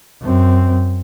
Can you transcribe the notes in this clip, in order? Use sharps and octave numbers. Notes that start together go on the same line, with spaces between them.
F#2 C4